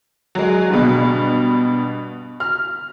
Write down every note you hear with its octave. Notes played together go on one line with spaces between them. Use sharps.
F#3 G#3
G2 B2
F6